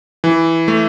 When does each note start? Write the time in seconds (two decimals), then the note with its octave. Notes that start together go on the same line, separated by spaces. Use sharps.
0.24 E3
0.68 A3